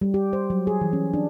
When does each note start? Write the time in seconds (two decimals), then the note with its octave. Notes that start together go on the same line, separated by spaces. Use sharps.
0.01 G3
0.14 G4
0.33 C5
0.50 F#3
0.67 G#4
0.81 E3
0.93 C#4
1.14 D4